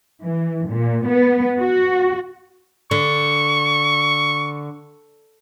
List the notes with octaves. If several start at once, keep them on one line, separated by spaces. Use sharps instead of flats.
E3
A#2
B3
F#4
D3 C#6